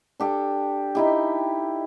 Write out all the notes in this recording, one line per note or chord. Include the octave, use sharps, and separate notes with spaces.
D4 G4 A4
D#4 E4 G4